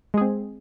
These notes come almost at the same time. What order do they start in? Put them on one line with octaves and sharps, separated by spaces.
G#3 G#4 C4